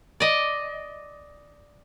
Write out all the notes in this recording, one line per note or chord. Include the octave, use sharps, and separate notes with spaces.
D5 D#5